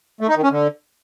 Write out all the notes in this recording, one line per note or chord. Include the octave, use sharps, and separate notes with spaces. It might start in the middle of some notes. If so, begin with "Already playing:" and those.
A3
D#4
D#3
C#4
D3